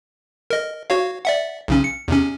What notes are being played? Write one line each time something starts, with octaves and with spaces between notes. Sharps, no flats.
A#4 D#5
F#4 C#5 F5
D5 E5 F#5
B1 C#3 C#4
C#7
E2 C3 C#4